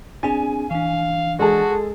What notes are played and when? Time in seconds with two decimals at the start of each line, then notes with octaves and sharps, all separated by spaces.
0.23 C4 D4 G#4 G#5
0.71 E3 D4 F5
1.39 G#3 F#4 G#4 A4 A5